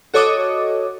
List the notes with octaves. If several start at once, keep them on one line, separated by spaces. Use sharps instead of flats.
F#4 A4 C#5 D#5 D6 D#6